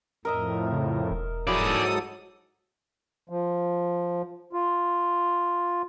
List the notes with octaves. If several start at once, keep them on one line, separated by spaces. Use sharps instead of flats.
F2 A2 A#4 D#5 E5
C#3
E1
G#2 F#3 E4 G#4 A4 D5 D#6
F3
F4